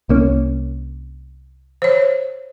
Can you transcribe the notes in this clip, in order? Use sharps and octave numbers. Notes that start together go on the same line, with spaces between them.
C2 A#3 C#4
C5 C#5